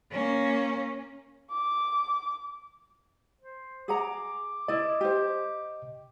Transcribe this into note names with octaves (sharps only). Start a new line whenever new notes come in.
A#3 C#4
D6
C5
G#4 F#5 A#5 D6
E4 D5 D#5
G4 C5